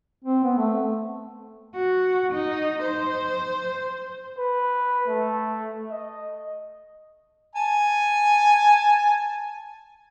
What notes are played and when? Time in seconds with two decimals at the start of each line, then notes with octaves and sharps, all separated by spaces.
0.25 C4
0.44 B3
0.58 A3
1.75 F#4
2.33 D#4
2.83 C5
4.38 B4
5.08 A3
5.92 D#5
7.55 G#5 A5